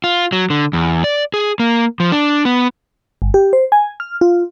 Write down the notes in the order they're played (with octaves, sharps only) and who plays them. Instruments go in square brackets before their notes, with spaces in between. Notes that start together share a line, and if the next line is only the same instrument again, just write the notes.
[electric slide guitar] F4
F#3
D3
E2
D5
G#4
A#3
F3
D4
B3
[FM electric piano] G1
G4
C5
G#5
F6
F4